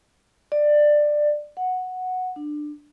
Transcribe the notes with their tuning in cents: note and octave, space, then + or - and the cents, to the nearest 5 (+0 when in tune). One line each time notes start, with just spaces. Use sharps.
D5 +15
F#5 -5
D4 +20